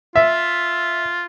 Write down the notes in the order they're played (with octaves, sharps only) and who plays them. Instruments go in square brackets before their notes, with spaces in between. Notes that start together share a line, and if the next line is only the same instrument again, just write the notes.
[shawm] F4 [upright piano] E5